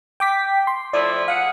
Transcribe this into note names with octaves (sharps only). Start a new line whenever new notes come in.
G5 D6 B6
C6
F3 A3 E4 D5
G#4 F5 F#5